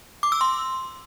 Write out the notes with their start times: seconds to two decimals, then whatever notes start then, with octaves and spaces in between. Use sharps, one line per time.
0.23 D6
0.32 E6
0.41 C6